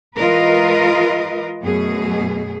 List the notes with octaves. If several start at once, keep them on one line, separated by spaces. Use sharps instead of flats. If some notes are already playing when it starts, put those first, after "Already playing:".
E3 G#3 F4 A#4 B4 D#5
F#2 B2 A3 G#4